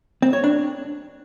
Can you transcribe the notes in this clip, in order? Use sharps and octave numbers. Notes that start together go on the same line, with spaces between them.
C4
C#5
D4